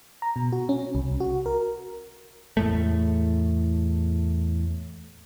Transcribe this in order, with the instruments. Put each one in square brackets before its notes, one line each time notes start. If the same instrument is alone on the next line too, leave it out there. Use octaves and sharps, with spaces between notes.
[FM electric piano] A#5
B2
F#4
C#4
C2
F#4
A#4
[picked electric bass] E2 A2 A3